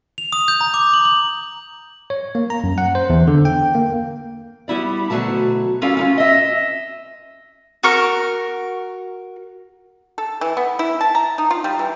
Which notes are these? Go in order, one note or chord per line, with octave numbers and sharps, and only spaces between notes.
F7
D#6
G6
A#5
D6
F#7
F#7
C#5
A#3
A#5
F#2
F#5
C5
E2
D3
G5
A#3
G3 B3 E4 D5
D2 B2 D#3 F#3 A3 A5
G3 C#4 F4 A4 D5 F5
C#4 D#4 F4
D#5 E5
F#4 A#4 C#6 F6
A4
E3
B3
E4
A5
A#5
D#4
F4
G3
E3